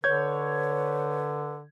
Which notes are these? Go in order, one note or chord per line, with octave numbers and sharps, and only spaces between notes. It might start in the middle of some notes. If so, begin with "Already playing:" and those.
D3 B4 C#5 G6 G#6